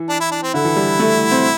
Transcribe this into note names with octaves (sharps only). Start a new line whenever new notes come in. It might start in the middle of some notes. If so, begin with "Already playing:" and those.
Already playing: E3
D4
E4
D4
C4
D3 E4
E3
G3
A3
C4